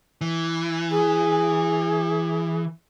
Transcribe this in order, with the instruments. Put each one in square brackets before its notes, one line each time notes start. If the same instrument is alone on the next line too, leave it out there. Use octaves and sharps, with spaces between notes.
[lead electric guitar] E3
[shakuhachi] G#4